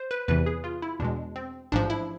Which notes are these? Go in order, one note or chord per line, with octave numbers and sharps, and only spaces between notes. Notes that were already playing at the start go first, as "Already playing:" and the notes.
Already playing: C5
B4
E2 C3 E3 B4
G#4
F4
E4
E2 B2 G#3 D4
C4
A1 G#2 F3 D4
E4